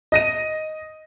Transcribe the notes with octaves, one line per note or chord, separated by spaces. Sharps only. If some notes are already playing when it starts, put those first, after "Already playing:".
D#5 A#6 D#7